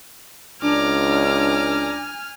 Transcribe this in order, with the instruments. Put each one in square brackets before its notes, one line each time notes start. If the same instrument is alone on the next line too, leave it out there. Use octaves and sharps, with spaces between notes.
[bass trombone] C#2 [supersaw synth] D4 [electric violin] G#5 F6 [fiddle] A#5 D6